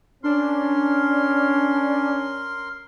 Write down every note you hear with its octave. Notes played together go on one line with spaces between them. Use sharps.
C#4 D4 A#4 C6